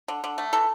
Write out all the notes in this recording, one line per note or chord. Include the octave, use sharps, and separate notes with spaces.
D3
D3
A3
E3 A4